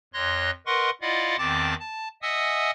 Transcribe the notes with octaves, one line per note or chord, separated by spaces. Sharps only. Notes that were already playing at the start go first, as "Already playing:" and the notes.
F2 C#5 C6 F#6 A#6
A#4 B4 D#5 F#5 C6 C#6
E4 F4 D5 D#5 F5 F#5
E2 D#3 C4 A5 D6 A6
A5
D#5 E5 F#5 G#5 D#6 E6